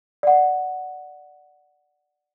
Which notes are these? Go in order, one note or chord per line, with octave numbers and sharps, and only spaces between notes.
D5 F#5